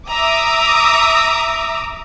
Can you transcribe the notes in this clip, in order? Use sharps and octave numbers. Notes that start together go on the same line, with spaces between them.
E5 A#5 D6 D#6